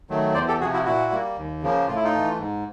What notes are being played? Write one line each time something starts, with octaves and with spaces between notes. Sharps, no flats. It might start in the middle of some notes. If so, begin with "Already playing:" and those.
D#3 F#3 A3
E2 C5 D5
G4 A4
C3 F3 F#4 G#4
E4 F#4
A#2 E4 F#4
G3 A#3
D#2
C#3 F3 A#3
A2 F4
E4
D#4 F4
E3 A3
G#2